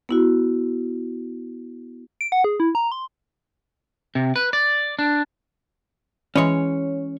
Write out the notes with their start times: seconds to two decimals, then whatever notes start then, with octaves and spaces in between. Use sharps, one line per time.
0.09 B3 E4 F#4
2.21 D7
2.32 F#5
2.44 G#4
2.60 E4
2.75 A#5
2.92 C6
4.15 C3
4.36 B4
4.53 D5
4.99 D4
6.36 E3 G#3 C#4 C#5